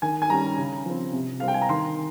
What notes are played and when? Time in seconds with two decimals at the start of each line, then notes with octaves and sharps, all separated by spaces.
0.02 D#3 G#5
0.22 G#5
0.29 G3 C#4 A#5
0.58 C#3
0.85 F3 C4
1.13 C3
1.40 G3 C4 F5
1.48 G5
1.54 G#5
1.62 A#5
1.69 D#3 C6